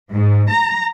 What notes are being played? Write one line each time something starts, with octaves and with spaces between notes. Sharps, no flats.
G#2
A#5